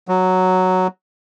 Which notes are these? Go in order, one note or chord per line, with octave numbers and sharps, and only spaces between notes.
F#3